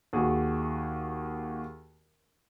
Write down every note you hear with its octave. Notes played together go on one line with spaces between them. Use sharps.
D#2 F#4 G#4